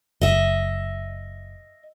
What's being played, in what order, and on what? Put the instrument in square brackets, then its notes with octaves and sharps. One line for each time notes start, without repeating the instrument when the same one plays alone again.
[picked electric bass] F#1 [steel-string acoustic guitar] D#5 E5